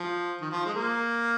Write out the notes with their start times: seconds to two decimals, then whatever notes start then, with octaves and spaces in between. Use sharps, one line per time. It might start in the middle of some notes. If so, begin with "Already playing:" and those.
Already playing: F3
0.41 D#3
0.51 F3
0.66 G#3
0.74 A#3